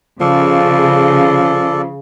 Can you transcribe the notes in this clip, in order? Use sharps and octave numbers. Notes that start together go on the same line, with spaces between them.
C#3 F3 A4 D5